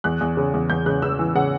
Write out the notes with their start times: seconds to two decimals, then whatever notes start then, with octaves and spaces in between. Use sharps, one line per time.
0.04 E2 F#6
0.21 E2
0.37 C#3
0.54 E2
0.70 E2 G6
0.86 C#3 F#6
1.02 C#3 E6
1.19 E3
1.35 C#3 F#5